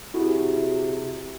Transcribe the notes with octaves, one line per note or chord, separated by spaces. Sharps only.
C3 E4 F#4 G#4